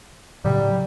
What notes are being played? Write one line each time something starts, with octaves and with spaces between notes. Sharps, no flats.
A2 C#3 F#3 G3